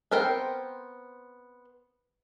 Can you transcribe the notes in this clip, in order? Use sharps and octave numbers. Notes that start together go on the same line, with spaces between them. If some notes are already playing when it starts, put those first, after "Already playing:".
B3 C4 A#4 C5 G5